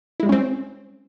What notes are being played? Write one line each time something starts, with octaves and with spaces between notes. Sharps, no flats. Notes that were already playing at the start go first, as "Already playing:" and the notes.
G3 G#3 C4 C#4 E4